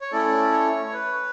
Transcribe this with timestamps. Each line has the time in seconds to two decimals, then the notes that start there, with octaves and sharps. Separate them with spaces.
0.01 C#5
0.12 A3 C#4 E4 A4 D5
0.52 C#5
0.93 B4